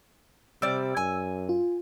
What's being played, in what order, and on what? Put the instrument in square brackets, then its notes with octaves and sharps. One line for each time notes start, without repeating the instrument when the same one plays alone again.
[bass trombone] C3 [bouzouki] G3 D5 [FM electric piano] E6
[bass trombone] F#2 [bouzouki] G#5
[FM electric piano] F4